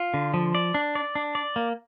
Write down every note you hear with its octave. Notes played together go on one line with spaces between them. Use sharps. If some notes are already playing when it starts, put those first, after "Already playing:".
Already playing: F4
D3
F3
D5
D4
D5
D4
D5
A#3